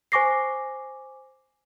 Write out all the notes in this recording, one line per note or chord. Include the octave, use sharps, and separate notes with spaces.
C5 G#5 C#6 D6 A#6 C7